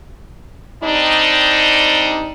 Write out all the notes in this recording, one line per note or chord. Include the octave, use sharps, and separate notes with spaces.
G3 C4 D4 D#4